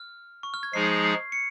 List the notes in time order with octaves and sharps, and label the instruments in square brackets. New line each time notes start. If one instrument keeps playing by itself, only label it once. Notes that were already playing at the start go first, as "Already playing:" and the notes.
Already playing: [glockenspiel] F6
C#6
F6
G#6
[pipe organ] F3 G#3 D#4 G#4 [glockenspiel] C7
[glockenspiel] C#7